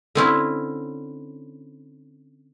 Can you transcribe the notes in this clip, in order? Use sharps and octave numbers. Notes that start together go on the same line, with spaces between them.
D3 C4 C#4 E4